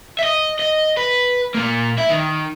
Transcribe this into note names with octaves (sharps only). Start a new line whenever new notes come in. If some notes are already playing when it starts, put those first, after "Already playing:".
D#5 E5
D#5
B4
A#2 A#3
E4
D#3